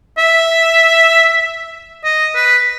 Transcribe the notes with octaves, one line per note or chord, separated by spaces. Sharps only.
E5
D#5
B4